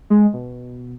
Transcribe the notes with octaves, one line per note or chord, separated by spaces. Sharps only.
G#3
B2